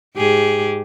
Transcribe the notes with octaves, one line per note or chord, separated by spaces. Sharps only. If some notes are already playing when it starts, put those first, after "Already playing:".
G#2 G4 G#4